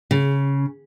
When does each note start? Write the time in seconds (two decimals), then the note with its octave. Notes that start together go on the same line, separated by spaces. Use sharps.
0.11 C#3